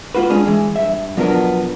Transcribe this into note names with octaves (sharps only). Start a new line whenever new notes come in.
A#3 B3 F4 F#4 B4
G#3 C#4 D4 G#4
E3 G#3
G2 E5
B2 F3 F#3 B3 D4 A#4